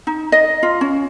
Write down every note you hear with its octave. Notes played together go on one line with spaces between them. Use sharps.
D#4
D#5
F4
C#4